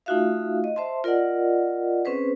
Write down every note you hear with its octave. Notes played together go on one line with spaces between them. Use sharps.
A3 D#4 F4 F#4 E5 F5
D#5
C5 E5 A5 C6
F4 A#4 D5 D#5 F#5
C4 C#4 G#4 B4 C5